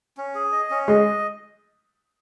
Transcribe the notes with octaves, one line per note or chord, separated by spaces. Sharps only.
C#4
G#4
D#5
C#4
G#3 D#5